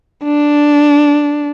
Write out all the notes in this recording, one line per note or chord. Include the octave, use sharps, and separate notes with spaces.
D4